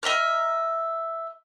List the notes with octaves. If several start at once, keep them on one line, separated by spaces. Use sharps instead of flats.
D#5 E5 A#5 F6